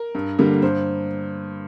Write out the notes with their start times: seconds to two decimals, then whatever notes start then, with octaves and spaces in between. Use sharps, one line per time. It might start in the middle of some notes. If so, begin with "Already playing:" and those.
Already playing: A#4
0.15 G2
0.39 D3 G3 A#3
0.62 G2 C5